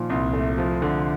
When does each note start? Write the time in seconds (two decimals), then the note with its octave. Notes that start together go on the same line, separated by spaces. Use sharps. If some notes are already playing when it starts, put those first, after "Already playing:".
Already playing: A#2 D#3 F3
0.10 C2
0.33 A3
0.58 F3
0.82 D3